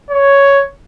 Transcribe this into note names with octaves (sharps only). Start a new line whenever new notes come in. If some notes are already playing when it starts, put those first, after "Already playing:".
C#5